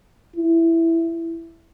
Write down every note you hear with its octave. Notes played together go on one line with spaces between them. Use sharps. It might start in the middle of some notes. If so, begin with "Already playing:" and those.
E4